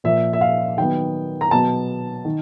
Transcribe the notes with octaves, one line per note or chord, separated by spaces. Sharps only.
A#2 F3 A#3 E5
E5
F5
D#3 F#3 B3 G5
A#5
B2 F#3 B3 A5
D#3